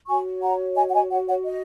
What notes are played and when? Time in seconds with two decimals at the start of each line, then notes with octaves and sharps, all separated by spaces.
0.07 F#4 C#5 G#5 C#6
0.42 F#5 A#5
0.76 D#5 G#5
0.89 F#5
0.94 D#5 G#5
1.10 C#5 F#5
1.27 C#5 F#5
1.44 D#5